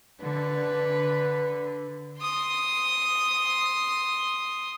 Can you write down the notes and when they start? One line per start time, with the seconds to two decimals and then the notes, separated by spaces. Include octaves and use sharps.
0.25 D3 B4
2.19 C6 D#6